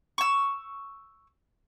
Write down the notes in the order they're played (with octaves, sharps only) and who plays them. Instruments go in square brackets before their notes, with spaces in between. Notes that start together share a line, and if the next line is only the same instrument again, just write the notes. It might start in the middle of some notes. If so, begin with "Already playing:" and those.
[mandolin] C#6 E6